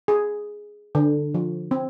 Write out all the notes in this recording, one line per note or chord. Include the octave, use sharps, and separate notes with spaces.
G#4
D3
F3
C4